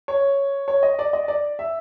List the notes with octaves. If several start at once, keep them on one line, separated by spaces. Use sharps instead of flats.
C#5
C#5
D#5
D5
D#5
D5
E5